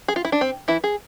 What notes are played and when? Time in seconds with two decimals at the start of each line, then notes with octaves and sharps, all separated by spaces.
0.08 G#4
0.16 F4
0.25 E4
0.32 D4
0.41 C4
0.68 E3 E4
0.84 G#4